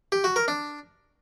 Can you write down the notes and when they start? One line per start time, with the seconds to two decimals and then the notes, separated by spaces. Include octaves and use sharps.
0.12 G4
0.24 F#4
0.36 A#4
0.48 D4